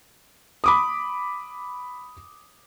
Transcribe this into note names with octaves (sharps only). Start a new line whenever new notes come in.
B5 D6 D#6